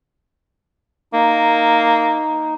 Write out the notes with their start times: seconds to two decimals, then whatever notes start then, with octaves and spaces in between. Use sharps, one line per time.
1.14 A#3 D#4